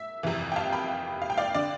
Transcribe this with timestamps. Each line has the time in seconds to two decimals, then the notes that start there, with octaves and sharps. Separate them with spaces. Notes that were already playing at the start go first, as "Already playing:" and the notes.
Already playing: E5
0.23 G1 F2 C3 E3
0.52 G5
0.56 F5 A5
0.72 G5 B5
1.22 F5
1.30 G5
1.37 D5 F5
1.55 D3 D5